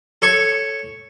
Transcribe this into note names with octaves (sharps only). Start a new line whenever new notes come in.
A4 C#5 C#6